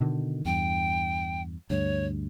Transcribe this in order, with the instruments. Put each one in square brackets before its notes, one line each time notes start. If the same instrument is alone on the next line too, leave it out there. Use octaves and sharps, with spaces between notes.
[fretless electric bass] B2 D3 D#3
[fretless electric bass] E2 G2 [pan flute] G5
[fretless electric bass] D2 G2 [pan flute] C#5